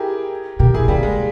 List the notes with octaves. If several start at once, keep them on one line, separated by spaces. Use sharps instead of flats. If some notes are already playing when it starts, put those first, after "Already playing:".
Already playing: E4 G4 G#4 A#4
B2 G4 A#4
D#3 E4 G#4
C#3 G3 A#3
G#3